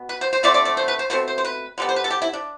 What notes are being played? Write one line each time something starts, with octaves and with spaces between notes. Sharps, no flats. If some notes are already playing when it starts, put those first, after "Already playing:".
Already playing: B2 B3
B4
C5
C5
D3 F3 A3 C4 D5
D5
D5
C5
B4
C5
B2 A3 C4 C5
C5
C5
B4
D3 G3 B3
C5
B4
A4
G4
E4
D4